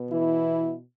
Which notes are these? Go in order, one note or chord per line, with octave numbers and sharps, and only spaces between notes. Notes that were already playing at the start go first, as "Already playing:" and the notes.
Already playing: B2 B3
E3 E4